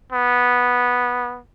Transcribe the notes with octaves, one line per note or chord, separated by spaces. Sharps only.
B3